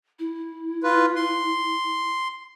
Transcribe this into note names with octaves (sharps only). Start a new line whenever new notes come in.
E4
F4 B4
C6